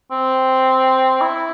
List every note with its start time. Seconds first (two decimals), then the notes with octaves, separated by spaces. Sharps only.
0.11 C4
1.21 E4